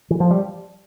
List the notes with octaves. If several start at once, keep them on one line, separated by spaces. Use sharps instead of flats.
E3
F3
G3